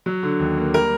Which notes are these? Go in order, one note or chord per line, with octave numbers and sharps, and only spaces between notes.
F#3
D3
D#2
A#3
G3 A#4